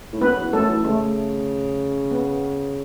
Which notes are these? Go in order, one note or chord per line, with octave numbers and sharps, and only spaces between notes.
A2
F#2 B3 B4
E2
F#2 A3 A4
E3
C#3 A3
B3